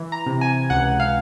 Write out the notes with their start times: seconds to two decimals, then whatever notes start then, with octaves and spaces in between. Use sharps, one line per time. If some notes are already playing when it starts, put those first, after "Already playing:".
Already playing: E3
0.12 A#5
0.26 C3
0.41 G#5
0.70 C#2 F#5
1.00 F5